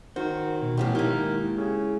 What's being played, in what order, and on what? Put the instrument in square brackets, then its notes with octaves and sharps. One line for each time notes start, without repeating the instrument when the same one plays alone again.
[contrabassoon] D#3 [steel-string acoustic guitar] F#4 [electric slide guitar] C5
[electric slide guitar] B2
[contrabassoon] A1 [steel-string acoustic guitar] F3 B3 G4
[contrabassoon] D#3 [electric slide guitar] G#3 E4 [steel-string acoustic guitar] A#3 G4
[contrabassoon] C#3